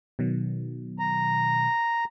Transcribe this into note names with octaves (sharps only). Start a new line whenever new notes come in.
B2 D#3 F#3
A#5